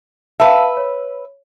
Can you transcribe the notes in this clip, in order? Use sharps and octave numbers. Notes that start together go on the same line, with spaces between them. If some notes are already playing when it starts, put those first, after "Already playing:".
B4 E5 F5 A5
C#5